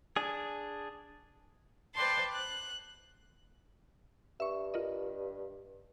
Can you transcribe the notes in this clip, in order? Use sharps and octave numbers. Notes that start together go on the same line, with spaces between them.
D4 G#4
B4 C5 D5 G5 A5 C6
F#6
G2 E5 C#6
F4 A#4 D#5